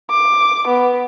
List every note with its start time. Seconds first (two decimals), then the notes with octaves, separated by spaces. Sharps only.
0.10 D6
0.67 B3